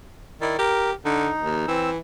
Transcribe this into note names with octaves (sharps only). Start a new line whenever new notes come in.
D#3 E4 D5
G4 A#4
D3 D#4
D#2
E3 C4 E6